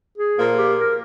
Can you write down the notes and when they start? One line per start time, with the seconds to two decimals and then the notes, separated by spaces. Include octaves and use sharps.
0.17 G#4
0.38 A#2 F3 A#3
0.57 G4
0.80 A#4